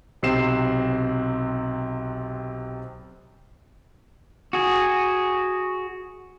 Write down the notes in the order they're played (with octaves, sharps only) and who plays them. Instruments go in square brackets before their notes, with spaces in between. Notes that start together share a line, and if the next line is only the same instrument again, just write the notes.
[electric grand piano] B1 C3 C4 C7 E7
[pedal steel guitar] F#4 G#4